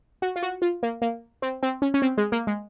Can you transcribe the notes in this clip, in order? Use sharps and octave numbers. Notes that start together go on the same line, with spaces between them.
F#4
F4
F#4
F4
A#3
A#3
C4
C4
C#4
C#4
C4
G#3
A#3
G#3